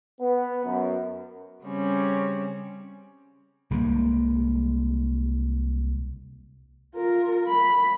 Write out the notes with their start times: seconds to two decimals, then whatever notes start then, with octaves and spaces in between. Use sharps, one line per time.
0.21 B3
0.65 F#2
1.66 C#3 G3 C4 C#4
3.71 C2 G3 G#3 A#3
6.95 F4 A#4
7.48 B5